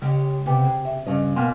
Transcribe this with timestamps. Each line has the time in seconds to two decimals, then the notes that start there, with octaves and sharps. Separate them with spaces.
0.02 C#3 G#3 C#4 G4
0.46 C3 B3 G4
0.64 G#4
0.85 E5
1.07 G2 C#3 D#5
1.36 B2 A#3 G5 G#5 C6